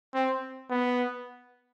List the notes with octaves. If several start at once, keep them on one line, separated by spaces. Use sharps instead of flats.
C4
B3